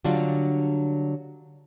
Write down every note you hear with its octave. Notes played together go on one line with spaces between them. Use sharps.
D3 F#3 G3 D4 F4